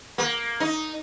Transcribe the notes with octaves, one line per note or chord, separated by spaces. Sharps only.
A#3
D#4